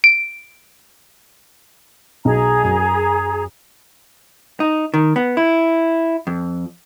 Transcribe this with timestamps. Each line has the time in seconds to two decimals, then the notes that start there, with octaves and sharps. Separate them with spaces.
0.04 D7
2.25 B1 G#4 A#5
2.63 F#2
4.60 D#4
4.94 D#3
5.16 B3
5.37 E4
6.27 F2